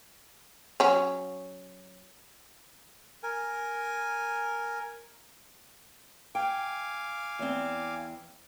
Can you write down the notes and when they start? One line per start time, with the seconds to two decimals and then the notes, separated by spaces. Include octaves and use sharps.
0.80 F#3 C#4
3.23 A#4 G#5
6.35 F5 G5 G#5 D6
7.39 E2 C4